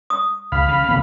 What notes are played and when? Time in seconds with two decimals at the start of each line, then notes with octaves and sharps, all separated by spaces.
0.10 D#6
0.52 C#2 F5 B5
0.68 C#3
0.89 C2 C#3 B3